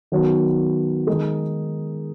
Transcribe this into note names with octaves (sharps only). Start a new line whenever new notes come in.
D#3 F#3 B3 F#4
D#3 G#3 D#4 G#4